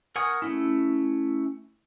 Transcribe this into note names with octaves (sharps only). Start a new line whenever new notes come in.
A#4 F#5 G#5 C#6 D#6
A3 C#4 E4